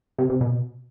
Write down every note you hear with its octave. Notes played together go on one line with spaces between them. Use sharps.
C3
C3
B2